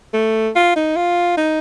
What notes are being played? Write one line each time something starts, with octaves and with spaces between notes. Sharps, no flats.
A3
F4
D#4
F4
D#4